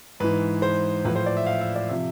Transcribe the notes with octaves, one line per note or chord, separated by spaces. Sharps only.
G#2 E3 B4
C5
A2 F3 B4
C5
D5
E5
F5
E5
D5
C3 F3 E5